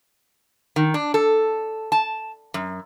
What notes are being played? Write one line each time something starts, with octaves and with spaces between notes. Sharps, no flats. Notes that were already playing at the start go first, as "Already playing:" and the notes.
D#3
D4
A4
A5
F#2